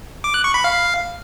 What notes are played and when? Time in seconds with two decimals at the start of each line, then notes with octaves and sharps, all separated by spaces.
0.24 D6
0.34 F#6
0.44 C#6
0.54 B5
0.64 F5